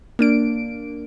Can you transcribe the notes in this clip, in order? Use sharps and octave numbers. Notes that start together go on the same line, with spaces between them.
A#3 D4 D7